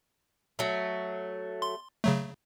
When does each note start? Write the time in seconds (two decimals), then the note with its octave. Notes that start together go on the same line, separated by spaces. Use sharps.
0.59 F#3 A3
1.62 C6
2.04 C#3 F#3 A3